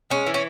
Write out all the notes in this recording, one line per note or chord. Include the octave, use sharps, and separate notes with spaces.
G#3 C#4
E3
C#4